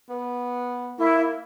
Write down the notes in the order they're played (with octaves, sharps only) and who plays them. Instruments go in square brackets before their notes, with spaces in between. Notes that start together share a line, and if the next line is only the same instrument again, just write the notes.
[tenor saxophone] B3
[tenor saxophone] A#3 [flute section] E4